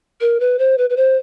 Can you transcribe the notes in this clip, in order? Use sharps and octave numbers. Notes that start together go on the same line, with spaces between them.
A#4
B4
C5
B4
B4
C5